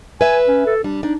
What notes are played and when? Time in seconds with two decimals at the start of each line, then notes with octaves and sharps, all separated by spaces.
0.21 B4 E5 G#5
0.48 C#4
0.66 A4
0.84 G3 D4
1.03 D4 D#4